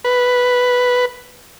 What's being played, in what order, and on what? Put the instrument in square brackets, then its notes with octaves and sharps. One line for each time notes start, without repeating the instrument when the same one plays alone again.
[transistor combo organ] B4